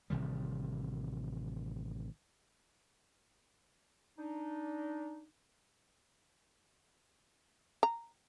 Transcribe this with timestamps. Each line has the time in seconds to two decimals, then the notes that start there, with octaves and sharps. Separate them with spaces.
0.10 A1 C3 D#3 G3
4.18 D4 D#4
7.83 A#5